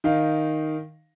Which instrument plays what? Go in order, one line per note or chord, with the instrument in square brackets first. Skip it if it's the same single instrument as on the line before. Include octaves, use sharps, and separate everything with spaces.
[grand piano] D#3 D#4 F5